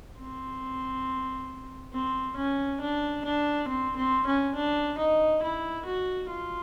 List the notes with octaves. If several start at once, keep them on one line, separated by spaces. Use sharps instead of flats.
C4
C4
C#4
D4
D4
C4
C4
C#4
D4
D#4
E4
F#4
F4